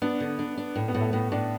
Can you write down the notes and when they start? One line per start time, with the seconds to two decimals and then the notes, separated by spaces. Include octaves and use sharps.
0.02 B3 D4
0.20 D3
0.39 D4
0.57 D4
0.75 A2
0.88 B3
0.94 A2
1.01 A3
1.13 A2 B3
1.32 A2 D4